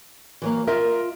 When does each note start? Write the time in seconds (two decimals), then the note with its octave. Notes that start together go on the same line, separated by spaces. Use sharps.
0.42 E3 F#3 A#3
0.67 F4 A#4 D#5 E5